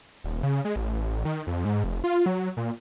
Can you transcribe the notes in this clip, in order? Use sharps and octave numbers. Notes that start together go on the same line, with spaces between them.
D#1
C#3
G#3
A1
D#3
F2
G#2
F1
F4
F#3
A#2